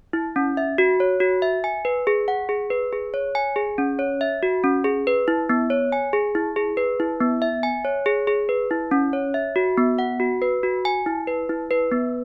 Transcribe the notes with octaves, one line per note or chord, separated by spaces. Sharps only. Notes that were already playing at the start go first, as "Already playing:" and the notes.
E4
C#4
E5
F#4
C#5
F#4
E5
G#5
B4
G#4
F#5
G#4
B4
G#4
C#5
G#5
G#4
C#4
C#5
E5
F#4
C#4
G#4
B4
E4
B3
C#5
G#5
G#4
E4
G#4
B4
E4
B3
E5
G#5
C#5
G#4
G#4
B4
E4
C#4
C#5
E5
F#4
B3
F#5
F#4
B4
F#4
G#5
E4
B4
E4
B4
B3